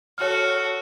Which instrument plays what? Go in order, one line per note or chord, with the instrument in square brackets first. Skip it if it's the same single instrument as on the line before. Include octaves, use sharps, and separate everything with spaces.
[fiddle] F#4 A4 [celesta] C#5 F6